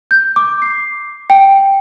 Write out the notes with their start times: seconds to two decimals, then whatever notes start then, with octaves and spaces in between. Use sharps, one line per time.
0.11 G6
0.36 D6
0.62 C7
1.30 G5